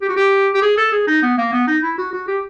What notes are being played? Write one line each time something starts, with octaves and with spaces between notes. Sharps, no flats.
G4
F#4
G4
G4
G#4
A4
G#4
D#4
B3
A#3
B3
D#4
E4
F#4
F#4
G4